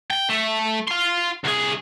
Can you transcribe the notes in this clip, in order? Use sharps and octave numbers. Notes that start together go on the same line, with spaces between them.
G5
A3
F5 C6
C2 G#4